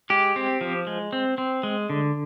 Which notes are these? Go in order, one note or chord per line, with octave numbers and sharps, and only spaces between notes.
G#3 G4
C4
F3
G#3
C4
C4
G#3
D3